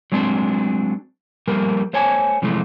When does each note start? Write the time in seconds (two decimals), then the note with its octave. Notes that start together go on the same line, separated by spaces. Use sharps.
0.12 F#3 G#3 A3 C4 D4
1.48 F3 G3 A3 A#3 A#4
1.93 A3 C5 C#5 G#5 A5
2.42 C3 E3 F3 G#3 A3